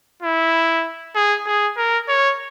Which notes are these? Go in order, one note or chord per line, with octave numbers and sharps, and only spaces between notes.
E4
G#4
G#4
A#4
C#5